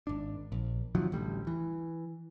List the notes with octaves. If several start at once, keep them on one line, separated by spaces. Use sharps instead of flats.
G#1 D4
A#1
C3 D#3 F3 F#3
A1 D2 G3
E3